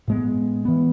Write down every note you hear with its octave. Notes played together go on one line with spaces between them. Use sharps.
A2 G#3 B3
E3 B3